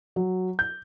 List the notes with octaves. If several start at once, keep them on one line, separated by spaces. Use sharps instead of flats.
F#3
G6